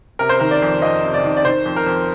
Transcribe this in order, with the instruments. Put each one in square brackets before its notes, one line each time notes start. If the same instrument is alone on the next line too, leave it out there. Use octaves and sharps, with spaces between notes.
[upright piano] C3 A#4
C5
D#3 A#4
D5
F2
F2 D#5
C3
D5
D#3
D5
D#3 C5
F2
A#4
F2